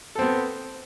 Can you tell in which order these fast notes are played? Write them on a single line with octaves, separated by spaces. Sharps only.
A4 C4 B3